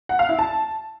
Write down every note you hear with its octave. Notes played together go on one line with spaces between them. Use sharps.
F#5
F5
E4
A5